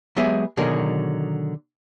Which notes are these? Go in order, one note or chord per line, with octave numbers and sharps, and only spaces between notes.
F#3 G#3 B3 G4 G#4 E5
B2 D3 D#3 F#3 G#4 A#4